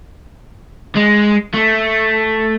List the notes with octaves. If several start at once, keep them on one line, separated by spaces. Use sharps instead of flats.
G#3
A3